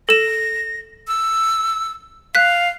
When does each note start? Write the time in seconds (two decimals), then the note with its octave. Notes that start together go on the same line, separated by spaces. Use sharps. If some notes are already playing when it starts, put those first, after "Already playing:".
0.09 A4 A#6 E7
1.08 E6
2.35 F5 F#6 B6